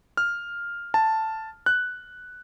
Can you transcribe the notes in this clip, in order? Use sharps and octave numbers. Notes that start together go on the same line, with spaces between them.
F6
A5
F#6